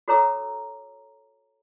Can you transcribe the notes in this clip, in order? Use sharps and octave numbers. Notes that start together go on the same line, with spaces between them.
F#4 A4 C#5 A#5 D6 E6